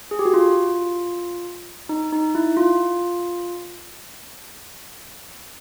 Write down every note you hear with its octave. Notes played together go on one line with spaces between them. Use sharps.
G#4
G4
F#4
F4
D#4
D#4
E4
F4